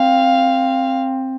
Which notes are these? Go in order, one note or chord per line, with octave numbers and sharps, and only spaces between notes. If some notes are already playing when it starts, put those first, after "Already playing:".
Already playing: C4 F5